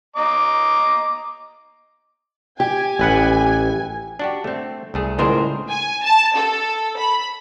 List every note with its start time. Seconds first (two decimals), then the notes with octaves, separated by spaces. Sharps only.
0.16 D#5 A#5 D6
2.60 G4 G#5
3.00 A1 B4 F#5
4.19 D4 F#4 G4
4.44 A3 C4
4.94 C2 A3 G#4
5.19 C#2 A2 D4 G#4 A#4 C5
5.69 G#5
6.04 A5
6.36 A4
6.99 B5